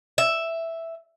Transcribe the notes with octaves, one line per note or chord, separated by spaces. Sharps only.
E5